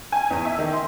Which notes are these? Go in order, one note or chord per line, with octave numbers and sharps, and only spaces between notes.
G#5
E2
E5
D#3
C6